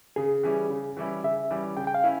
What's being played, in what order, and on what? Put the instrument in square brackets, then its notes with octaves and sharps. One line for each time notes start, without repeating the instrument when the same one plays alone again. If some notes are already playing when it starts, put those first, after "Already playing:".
[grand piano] C#3 [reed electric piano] G#4
[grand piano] E3 G3 C#4 E4
C#3
E3 G3 C#4 E4
[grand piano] C#3 [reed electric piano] E5
[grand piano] E3 G3 C#4 E4
[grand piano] C#3 [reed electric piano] G5
[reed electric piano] G5
F5
[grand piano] C#4 E4